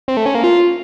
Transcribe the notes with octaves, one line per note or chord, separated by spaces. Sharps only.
C4
A3
C#4
A#3
F4